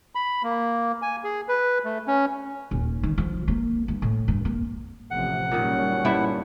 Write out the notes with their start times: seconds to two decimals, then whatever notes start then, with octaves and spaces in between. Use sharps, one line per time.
0.15 B5
0.43 A#3
1.02 G#5
1.24 G#4
1.48 B4
1.85 A3
2.07 C#4
2.71 D#1
3.03 D#3
3.18 F3
3.48 A#3
3.88 G2
4.02 A2
4.28 G2
4.45 A#3
5.11 A1 C3 F3 F#5
5.52 F#1 A#2 D#3 G3 C#4
6.05 G2 E4 C5